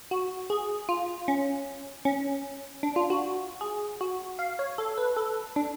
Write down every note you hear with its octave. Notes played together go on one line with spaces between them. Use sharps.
F#4
G#4
F4
C#4
C#4
D4
F4
F#4
G#4
F#4
F5
C#5
A4
B4
A4
D4